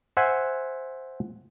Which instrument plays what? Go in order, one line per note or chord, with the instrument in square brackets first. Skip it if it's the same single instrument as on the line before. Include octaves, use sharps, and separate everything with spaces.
[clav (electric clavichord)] C5 E5 F#5 G#5